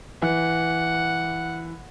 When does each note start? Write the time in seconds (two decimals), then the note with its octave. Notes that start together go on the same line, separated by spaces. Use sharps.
0.22 E3 F#5